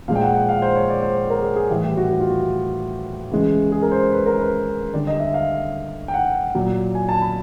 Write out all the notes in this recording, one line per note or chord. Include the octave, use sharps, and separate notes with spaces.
A#2 F3 G#3 F5
G5
F#5
F#5
F5
C5
C#5
D5
C5
C#5
A#4
G#4
G#4
A2 E3 G3 G4
G4
F#4
F#4
F4
F#4
C#3 E3 G#3
G#4
A#4
C5
B4
A#4
B4
D3 G3 D5
D#5
E5
F5
G5
F#5
A#2 F#3
G#5
A5
B5